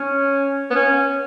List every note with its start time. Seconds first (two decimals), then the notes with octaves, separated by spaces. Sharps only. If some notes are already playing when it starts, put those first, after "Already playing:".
Already playing: C#4
0.71 B3
0.75 C#4